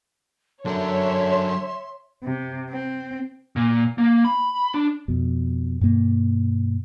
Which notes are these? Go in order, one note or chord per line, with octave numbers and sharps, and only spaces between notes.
D3 F#3 A#4 C#5 E5 C6
C3
C4
A#2
A#3
B5
D4
F2 B2
G2 B2 A#3